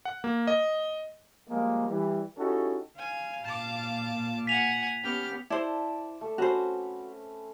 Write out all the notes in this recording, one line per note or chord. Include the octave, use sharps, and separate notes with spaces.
F#5
A#3
D#5
F3 G3 G#3 A#3
E3 G3
C#4 D#4 E4 F#4 G4 A4
F5 G#5
A#2 A5 D6
F#5 G#5 B6 F7
B3 C#4 G4 F6
E4 C5 D5 A5
A3
C4 C#4 F#4 B4 C5